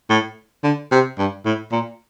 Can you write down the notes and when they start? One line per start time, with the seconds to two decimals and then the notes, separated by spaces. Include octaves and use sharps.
0.10 A2
0.64 D3
0.91 C3
1.18 G2
1.45 A2
1.72 A#2